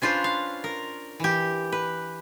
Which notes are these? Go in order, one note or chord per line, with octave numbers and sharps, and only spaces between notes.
C#4 D4 F4 B4 C5
F5
A#4
E3 G4
B4